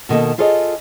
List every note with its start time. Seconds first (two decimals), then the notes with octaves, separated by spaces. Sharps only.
0.09 B2 D#3 A#3 A4 D#5
0.38 F4 G#4 A4 C#5 D#5